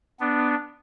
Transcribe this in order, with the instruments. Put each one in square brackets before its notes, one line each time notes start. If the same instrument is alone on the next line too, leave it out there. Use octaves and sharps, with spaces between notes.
[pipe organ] B3 D4